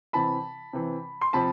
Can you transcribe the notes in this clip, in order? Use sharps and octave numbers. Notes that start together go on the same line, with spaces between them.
C3 E3 A5 B5
C3 E3
C6
C3 F3 A5 B5